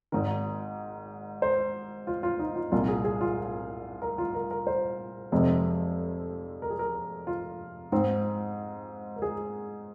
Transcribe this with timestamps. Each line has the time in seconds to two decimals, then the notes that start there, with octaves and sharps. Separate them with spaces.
0.12 G#1 G#2 D#3 A#4
1.42 C5
2.07 F4
2.23 F4
2.39 D#4
2.56 F4
2.72 C2 A#2 A#3 F4
2.88 G#4
3.05 G#4
3.21 F4
4.02 A#4
4.18 F4
4.34 A#4
4.51 A#4
4.67 C5
5.32 F1 F2 C3 G#3
6.62 A#4
6.71 G#4
6.79 A#4
7.27 F4
7.92 G#2 G#3 C4
9.16 A#4
9.22 G#4